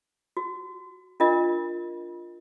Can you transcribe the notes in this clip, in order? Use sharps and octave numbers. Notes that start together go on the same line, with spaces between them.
F#4
D4 F4 A#4 D#5